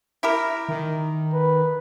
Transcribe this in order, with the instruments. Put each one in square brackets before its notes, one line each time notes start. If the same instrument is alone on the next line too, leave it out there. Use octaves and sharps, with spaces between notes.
[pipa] E4 G4 A#4
[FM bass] D#3
[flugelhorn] B4